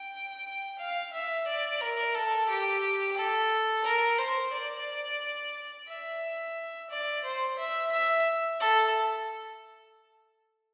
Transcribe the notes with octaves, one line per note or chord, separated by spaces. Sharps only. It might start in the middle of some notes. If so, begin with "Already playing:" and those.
Already playing: G5
F5
E5
D5
A#4
A4
G4
A4
A#4
C5
D5
E5
D5
C5
E5
E5
A4